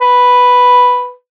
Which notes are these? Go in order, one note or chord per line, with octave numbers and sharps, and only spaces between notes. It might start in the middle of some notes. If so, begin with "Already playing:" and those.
B4